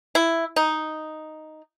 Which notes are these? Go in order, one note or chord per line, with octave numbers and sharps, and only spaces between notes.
E4
D#4